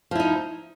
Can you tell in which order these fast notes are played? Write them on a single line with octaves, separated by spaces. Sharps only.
F3 E4 D#4